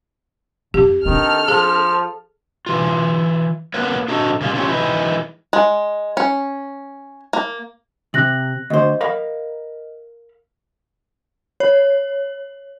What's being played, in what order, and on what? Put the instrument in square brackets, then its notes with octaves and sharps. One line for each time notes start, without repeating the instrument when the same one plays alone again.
[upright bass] F2 [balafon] G4
[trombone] D#3 [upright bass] C4 D4 [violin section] A4 F6
[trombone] F3 [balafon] G#4
[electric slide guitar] E3 F4
A#3 B3 A#4 B4 C#5
D4 F#4 A4 C5 D#5 A#5
C#3 G3 A#3 C#4 F4
C4 C#4 F4 G4 C#5
E3 G#3 D#4 B4
[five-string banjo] G#3
C#4
A#3
[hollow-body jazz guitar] C3 [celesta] F#6 A#6 F#7
[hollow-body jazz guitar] D2 C5 [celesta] D#5
[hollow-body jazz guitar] A#4 F5 B5
[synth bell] C#5